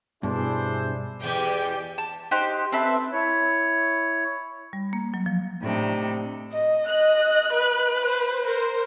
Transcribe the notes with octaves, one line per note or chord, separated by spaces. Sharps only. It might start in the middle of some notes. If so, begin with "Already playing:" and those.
G2 B2 D4 E4 G#4 C5
E2 G#3 G4 G5
A5
D#4 G4 C5 F#6
C4 A4 B4 E5
E4 C#5
G3
A#3
F#3
F3
A2 C3 D4 D#4
D#5
D#5 F#6
B4
C5
A#4 C5